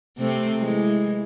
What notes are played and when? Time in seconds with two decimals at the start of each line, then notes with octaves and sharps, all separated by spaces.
0.18 C3 A3 C4
0.58 E3 G#3